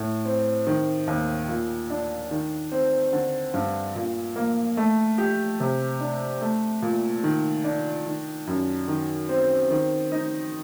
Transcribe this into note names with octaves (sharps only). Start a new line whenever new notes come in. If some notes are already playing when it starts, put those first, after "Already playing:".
Already playing: A2
C4
D#3
D#2
A#2
D4
D#3
C4
D3
G2
A#2
A#3
A3
G4
C3
D4
A3
A#2
D#3
D4
D#3
F#2
D#3
C4
D#3
D#4